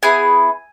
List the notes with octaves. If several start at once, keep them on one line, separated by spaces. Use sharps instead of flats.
B3 E4 G#4 G#5